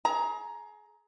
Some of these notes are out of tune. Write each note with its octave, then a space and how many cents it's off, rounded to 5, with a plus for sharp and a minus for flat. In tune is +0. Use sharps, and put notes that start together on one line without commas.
G#4 +30 A#5 +10